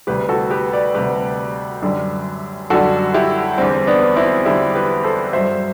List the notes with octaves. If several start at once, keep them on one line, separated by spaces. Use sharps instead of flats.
D2 C3 G3 G4 B4
F#4 A4
G4 B4
B4 D5
D2 C3 G3 G4 B4
F#2 D3 G3
F#2 D3 G3 F#4 A4
E4 G4
E2 D3 G3 C4
B3 D4
C4 E4
E2 D3 G3 E4 G4
G4 B4
A4 C5
G2 F#3 C5 E5